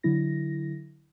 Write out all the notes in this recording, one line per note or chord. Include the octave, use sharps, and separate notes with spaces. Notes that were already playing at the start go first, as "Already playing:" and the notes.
D3 F#3 E4 A#6